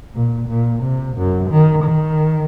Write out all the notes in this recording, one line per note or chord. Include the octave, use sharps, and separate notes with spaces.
A#2
A#2
C3
F#2
D#3
D#3